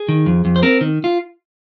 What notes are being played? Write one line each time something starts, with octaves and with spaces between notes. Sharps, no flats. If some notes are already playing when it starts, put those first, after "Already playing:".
Already playing: G#4
D#3
F2
F2
C5
C4 A#4
D#3
F4